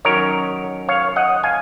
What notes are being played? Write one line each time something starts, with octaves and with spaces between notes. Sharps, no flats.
D#3 F#3 C#4 A#4 C#5
C#5 F5
D#5 F#5
F5 G#5